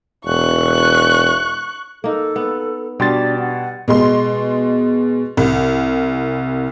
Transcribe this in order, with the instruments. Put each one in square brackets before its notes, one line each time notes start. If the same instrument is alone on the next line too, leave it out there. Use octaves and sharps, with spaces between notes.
[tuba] E1 [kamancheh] C#6 F#6
[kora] A#3 D#4 [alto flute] A4
[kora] B3
[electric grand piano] B2 C6 A6 [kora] G3 [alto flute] D4
[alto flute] F#5
[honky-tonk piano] B2 G#3 C6
C2